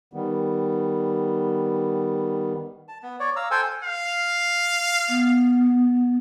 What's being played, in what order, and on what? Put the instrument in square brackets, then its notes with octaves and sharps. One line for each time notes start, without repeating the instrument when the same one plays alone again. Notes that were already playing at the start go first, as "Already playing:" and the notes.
[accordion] D#3 G3 B3
[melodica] A5
B3
C#5 D5
F5 A#5 E6
A4 C5 G5 G#5
[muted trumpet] F5
[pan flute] B3